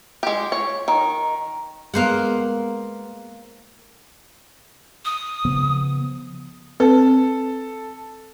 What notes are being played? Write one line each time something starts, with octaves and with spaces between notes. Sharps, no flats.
G#3 G4
C#5
D#3
G#3 A#3 B3 C5 F#5
D#6
C#3 F3 B3
C4 A4 B4